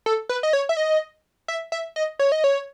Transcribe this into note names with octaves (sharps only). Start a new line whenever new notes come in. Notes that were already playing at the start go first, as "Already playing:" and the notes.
A4
B4
D#5
C#5
E5
D#5
E5
E5
D#5
C#5
D#5
C#5